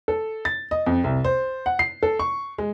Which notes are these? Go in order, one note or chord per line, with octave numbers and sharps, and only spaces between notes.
A4
A6
D#5
F2
C2
C5
F#5
C7
A4
C#6
G#3